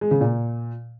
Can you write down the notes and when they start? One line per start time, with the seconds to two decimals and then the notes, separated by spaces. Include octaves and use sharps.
0.01 G#3
0.11 C#3
0.21 A#2